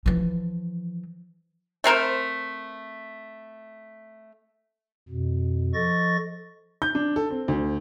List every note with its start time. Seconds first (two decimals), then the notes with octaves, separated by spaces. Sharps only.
0.06 E3 F3
1.84 A3 C4 A#4 C5
5.09 F2 B2
5.74 F3 A4 D#5 C#6 A6 A#6
6.82 G6
6.95 D4
7.16 A4
7.30 C4
7.48 D2